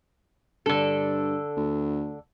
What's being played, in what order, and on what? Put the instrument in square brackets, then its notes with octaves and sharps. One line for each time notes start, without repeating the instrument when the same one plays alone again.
[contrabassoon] G2 [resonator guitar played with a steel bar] D3 A4
[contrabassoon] D2